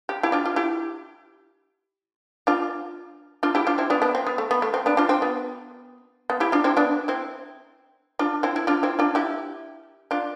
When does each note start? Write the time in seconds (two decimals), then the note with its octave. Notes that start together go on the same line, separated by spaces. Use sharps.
0.09 G4
0.23 E4 G4
0.32 D4 F4
0.46 F4
0.56 E4 G4
2.47 D4 F4
3.43 D4 F4
3.55 E4 G4
3.67 D4 F4
3.78 C4 E4
3.90 B3 D4
4.02 B3 D4
4.15 C4
4.27 B3
4.38 A3
4.51 B3
4.62 A3
4.74 C4
4.86 B3 D4
4.97 D4 F4
5.09 C4
5.22 B3
6.30 B3
6.40 E4 G4
6.52 D4 F4
6.64 C4 E4
6.77 B3 D4
7.08 C4 E4
8.19 D4 F4
8.43 C4 E4
8.56 E4
8.67 D4 F4
8.83 C4 E4
8.99 D4 F4
9.15 E4 G4
10.11 D4 F4